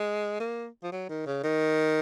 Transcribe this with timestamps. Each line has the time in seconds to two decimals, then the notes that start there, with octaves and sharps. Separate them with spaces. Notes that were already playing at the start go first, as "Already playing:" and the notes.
Already playing: G#3
0.40 A#3
0.83 F3
0.92 F#3
1.09 D#3
1.26 C#3
1.44 D#3